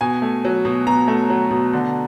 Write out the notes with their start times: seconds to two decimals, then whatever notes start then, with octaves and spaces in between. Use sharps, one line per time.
0.01 B2 G#5
0.22 A3
0.45 F#3
0.65 B2
0.87 B2 A#5
1.08 A3
1.30 F#3
1.51 B2
1.73 D3